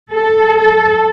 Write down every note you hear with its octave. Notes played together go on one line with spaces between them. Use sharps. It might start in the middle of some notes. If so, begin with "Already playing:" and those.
A4
A4